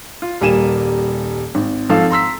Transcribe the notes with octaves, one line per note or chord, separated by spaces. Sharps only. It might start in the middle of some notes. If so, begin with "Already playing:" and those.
F4
D#1 G3 A#3 G#5 D#7 E7
G#1
G#1 F3 A4 F5 A5
A#5 C6 E6 B6